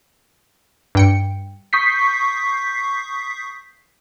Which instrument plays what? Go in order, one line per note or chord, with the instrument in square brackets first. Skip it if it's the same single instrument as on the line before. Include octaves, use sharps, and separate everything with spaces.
[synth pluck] G2 G5 C#7
[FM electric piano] C#6 D#6 G6 B6 C7